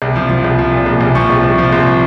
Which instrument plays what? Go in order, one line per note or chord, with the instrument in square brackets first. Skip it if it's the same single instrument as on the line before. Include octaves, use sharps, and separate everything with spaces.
[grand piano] C2
F3
F3
C2
F3
A#2
C2
C2
F3 C#6
C2
C2
F3
C2 C6